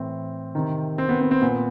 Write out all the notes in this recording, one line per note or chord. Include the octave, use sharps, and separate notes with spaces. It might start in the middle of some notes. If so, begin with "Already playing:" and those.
Already playing: A2 E3 C4
C3 D#3
C4
B3
C4
C4
A#2 B3